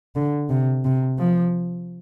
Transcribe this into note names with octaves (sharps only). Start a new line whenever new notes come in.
D3
C3
C3
F3